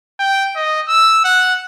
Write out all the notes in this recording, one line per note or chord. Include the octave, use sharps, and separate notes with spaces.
G5
D#5
E6
F#5